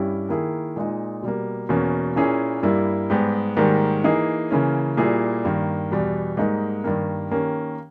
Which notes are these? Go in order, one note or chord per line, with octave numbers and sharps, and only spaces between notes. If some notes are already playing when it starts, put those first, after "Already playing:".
Already playing: G2 G3 C#4 E4 G4
D#3 A#3 E4 G#4
A#2 G#3 D#4
B2 G3 A#3
E2 B2 A#3 C#4
A#2 A#3 C#4 E4 G#4
G2 G3 A#3 E4
G#2 G3 B3 G4
G#2 D#3 G3 A#3
E3 A#3 D#4 G#4
C#3 E3 A#3 C#4
A#2 G3 A#3 E4 G#4
G2 D#3 A#3
E2 B2 G3
G#2 G3 A#3 D#4
G2 D#3 G3 A#3
D#3 A#3 C#4 G4